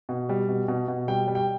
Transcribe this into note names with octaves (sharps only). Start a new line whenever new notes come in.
B2
G3
B2
B2
B2
G3 G5
G3
G5